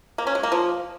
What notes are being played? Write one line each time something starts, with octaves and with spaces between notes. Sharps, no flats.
A#3
C#4
G#3
A#3
F3